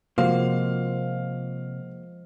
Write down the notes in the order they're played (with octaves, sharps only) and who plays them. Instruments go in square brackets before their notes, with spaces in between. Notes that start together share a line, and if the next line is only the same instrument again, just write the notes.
[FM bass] C3 [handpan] F3 G#3 [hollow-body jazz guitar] A#3 F#4 C5 [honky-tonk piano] F5